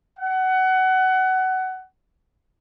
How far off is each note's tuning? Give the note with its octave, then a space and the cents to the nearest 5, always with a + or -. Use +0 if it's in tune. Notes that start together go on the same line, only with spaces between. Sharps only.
F#5 +20